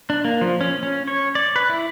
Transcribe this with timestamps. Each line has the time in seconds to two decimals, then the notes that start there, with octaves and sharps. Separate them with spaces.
0.10 D4
0.25 A#3
0.41 F3
0.61 C#4
0.83 C#4
1.08 C#5
1.35 D5
1.56 B4
1.69 E4